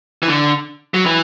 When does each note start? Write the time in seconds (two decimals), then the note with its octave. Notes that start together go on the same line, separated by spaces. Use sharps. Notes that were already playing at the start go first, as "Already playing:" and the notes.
0.23 E3
0.28 D3
0.94 F#3
1.06 E3